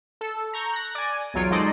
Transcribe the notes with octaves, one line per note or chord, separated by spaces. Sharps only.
A4
A#5 C#6 G6 A#6
F#6 A#6
D5 G#5
B1 E2 F#3 F4 C#5 D7
G#3 D#4 A4 C5 D5 D#5